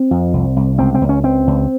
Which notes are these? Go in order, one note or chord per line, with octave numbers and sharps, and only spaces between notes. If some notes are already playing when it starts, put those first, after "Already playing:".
Already playing: C4
F2
C2
C2
C#2 C4
C4
C#2
C#4
C#2 C4
C#2